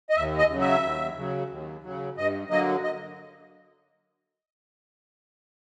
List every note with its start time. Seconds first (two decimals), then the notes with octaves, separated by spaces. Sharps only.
0.10 D#5
0.16 D#2 E5
0.38 D#5
0.49 C#3 F#3
0.60 E5
0.83 D#2
1.17 C#3 F#3
1.50 D#2
1.83 C#3 F#3
2.17 G2 D#5
2.50 D3 F#3 A#3 D#5
2.84 D#5